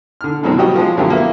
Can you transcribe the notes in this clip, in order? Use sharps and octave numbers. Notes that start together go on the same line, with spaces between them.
D3 F6
F#2 B2 D3 F#3 G#3 C4
F#3 G3 F#4 G4 D#5
F3 G#3
F#2 D3 F3 F#3 A3 G4
A#3 B3 E4